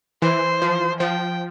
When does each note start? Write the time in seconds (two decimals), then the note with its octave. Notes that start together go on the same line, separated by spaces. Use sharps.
0.22 E3 C5
0.62 F3
1.00 F3 G5